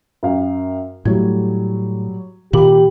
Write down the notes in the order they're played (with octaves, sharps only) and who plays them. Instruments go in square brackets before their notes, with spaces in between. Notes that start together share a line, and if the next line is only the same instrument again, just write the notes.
[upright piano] F#2 F5 G5
[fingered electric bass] A2 A3 [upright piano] F#3 G3 G#6
[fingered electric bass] A#2 D#3 [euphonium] G4 [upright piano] B5 D6 F#7